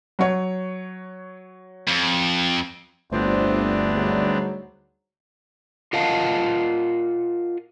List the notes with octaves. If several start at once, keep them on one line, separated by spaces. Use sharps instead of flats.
F#3 C#5
F2
G1 D2 A2 F3 B3 C4 D4 C5
G#2 F#3 G3
F4 A#4 D#5 F5 F#5 A5